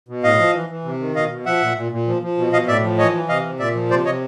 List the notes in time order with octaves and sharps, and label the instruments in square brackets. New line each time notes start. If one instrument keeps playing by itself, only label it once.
[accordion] B2
A2 D#5 F5
F3
E3
E3
C3
D#3
B2 D#5 F5
B2
F3 E5 F#5
A#2
A#2
A#2
F3
F3
B2
B2 D#5 F5
A2 D5 E5
F3
E3 C#5 D#5
E3
C3 D#5 F5
C3
A#2 D5 E5
F3
C3 C5 D5
C3 C#5 D#5